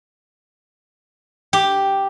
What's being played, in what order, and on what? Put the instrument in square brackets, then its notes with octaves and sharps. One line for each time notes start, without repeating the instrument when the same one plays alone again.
[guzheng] G4